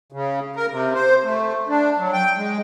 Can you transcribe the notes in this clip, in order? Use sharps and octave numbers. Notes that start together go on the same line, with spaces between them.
C#3
A#4
C3
C5
A3
D4
F#3
G5
G#3